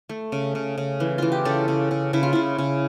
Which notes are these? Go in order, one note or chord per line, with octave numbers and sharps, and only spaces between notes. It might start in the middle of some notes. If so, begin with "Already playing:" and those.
A3
C#3
C#3
C#3
E3
E3 F4
G4
C#3 A4
C#3
C#3
C#3 E4
F4
C#3 E4
C#3